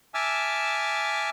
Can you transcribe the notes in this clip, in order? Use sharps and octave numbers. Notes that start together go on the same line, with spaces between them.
E5 G#5 A5 D6 E6 F6